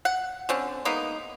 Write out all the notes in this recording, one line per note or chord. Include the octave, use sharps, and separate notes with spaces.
F#5
D3 C4 C#4
G#3 A#3 B3 D#4